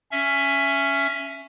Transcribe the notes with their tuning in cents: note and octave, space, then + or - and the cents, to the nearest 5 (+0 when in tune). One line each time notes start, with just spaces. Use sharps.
C#4 +0 E5 +10